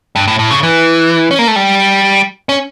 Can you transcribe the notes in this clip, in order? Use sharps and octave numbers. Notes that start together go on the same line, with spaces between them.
G2
A2
A2
C#3
E3
C#4
A#3
A3
G3
C#4